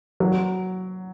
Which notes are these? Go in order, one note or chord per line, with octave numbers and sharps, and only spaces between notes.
F#3